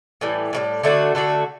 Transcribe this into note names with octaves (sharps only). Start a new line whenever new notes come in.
A2 E3 G3
A2 E3 G3
D3 A3 D4 F#4
D3 A3 D4 F#4